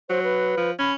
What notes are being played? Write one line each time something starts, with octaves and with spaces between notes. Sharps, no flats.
F#3 C5
B4
F3
C#4 B5